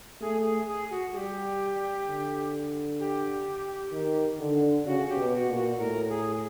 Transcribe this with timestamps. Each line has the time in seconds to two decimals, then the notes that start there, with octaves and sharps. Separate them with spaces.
0.21 A3 G#4
0.45 G#4
0.68 G#4
0.90 F#4
1.13 G3 G4 G#4
2.07 D3
3.00 G4
3.92 D#3
4.39 D3
4.85 C#3 F#4
5.09 G4
5.16 B2
5.33 F#4
5.47 A#2
5.56 F#4
5.78 A2 A#4
6.09 G#4